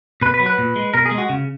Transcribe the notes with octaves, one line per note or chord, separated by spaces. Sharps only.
B2 B4
B4
F#3
B4
A#2
G#3
B2 A#4
G#4
G#3
F#4
C#3